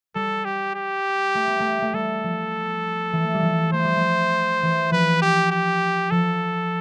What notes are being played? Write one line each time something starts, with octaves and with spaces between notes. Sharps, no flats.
G3 A4
G4
G4
A3
B3
A3
A3
G3 A4
F3
E3
A3
G3
F3
A3 C5
G3
A3
E3
F3 B4
G4
G4
F3 A4